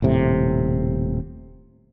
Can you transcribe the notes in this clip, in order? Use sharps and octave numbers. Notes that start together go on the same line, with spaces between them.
D#1 A2 C3